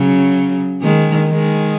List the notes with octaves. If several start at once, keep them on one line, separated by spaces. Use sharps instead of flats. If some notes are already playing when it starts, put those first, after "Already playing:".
Already playing: C#3 F#3
D#3 G#3
D#3 G#3